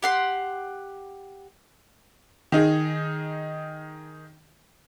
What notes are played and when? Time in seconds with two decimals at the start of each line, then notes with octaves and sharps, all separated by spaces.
0.03 G4 F#5 C6
2.52 D#3 D#4 G#4